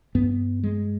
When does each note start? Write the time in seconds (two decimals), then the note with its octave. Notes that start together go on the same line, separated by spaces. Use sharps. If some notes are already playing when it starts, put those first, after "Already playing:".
0.15 G2 B3
0.63 G#3